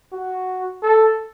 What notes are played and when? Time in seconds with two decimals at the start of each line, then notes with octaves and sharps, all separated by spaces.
0.12 F#4
0.82 A4